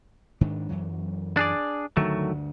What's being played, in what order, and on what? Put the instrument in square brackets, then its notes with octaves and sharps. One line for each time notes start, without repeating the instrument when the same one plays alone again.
[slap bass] G#2 D#3 D4
F#2 E3 F#3
[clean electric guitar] D4 G#4 D5
[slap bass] D2 G2 D3 [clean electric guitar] D#3 F#3 A3